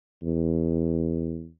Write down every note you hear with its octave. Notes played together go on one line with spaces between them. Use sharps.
E2